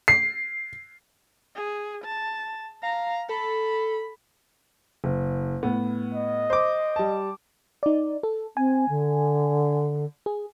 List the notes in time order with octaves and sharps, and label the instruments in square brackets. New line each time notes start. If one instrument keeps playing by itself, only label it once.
[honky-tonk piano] C7
[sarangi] G#4
A5
[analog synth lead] F5 [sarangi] A#5
[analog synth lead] A4 [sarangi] B5
[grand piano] F#1
A2 B3
[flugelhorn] D#5
[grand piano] C5 D6
G3 A5
[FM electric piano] D#4 D5
A4
[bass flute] C4 [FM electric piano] G#5
[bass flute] D3
[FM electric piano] G#4